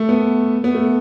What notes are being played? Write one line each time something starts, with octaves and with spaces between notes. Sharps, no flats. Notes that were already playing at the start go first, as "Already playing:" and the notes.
Already playing: A3
B3
B3
A3